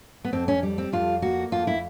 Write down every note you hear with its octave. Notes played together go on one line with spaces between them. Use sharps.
B3
F2 C4
C#4
G3
C4
F2 F4
A#3 F#4
F2 F4
E4